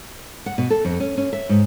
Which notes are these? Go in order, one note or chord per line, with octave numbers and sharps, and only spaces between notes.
F#5
B2
A4
F2
C#4
C#4
E5
G#2